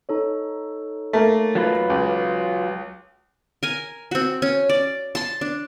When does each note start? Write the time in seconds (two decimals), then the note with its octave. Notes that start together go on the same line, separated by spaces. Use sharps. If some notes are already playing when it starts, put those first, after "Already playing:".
0.09 D#4 A4 C#5
1.13 A3 A#3
1.55 F#3 F4 B4
1.90 C#2
3.63 A#4 G#5
4.11 C4 F#4
4.42 C#4
4.69 D5
5.15 A5 C6
5.41 D4